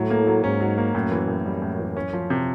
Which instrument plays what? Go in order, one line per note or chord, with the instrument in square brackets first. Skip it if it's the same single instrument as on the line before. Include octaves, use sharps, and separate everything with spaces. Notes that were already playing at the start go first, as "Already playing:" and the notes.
Already playing: [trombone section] A2 [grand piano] F#3
[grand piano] A#3
F#3
[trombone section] G#2 [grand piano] C#4
[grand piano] F#3
A#3
[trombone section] F#2 [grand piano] A2
[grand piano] E3
A2
G3
A2
E3
C#4
F3
C3